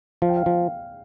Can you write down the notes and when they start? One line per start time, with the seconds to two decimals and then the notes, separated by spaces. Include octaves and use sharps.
0.22 F3 F5
0.29 G5
0.37 F5
0.46 F3